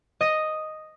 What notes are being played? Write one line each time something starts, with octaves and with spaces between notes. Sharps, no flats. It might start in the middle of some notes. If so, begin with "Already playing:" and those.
D#5